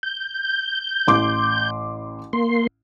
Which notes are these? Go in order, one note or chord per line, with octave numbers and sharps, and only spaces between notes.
G6
A1 C6 D6
A#3 C6